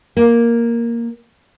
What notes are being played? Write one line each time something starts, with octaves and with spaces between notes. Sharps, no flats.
A#3